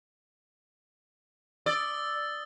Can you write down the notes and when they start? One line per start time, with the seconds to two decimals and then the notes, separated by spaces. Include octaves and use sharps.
1.66 D5 D#6 E6 A6